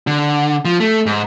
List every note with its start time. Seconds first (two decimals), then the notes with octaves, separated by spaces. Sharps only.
0.07 D3
0.65 F3
0.80 A3
1.06 G#2